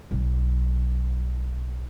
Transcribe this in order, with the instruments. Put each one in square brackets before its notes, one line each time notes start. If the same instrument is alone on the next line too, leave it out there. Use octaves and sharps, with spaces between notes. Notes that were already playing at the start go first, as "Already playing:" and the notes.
[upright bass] B1 F#3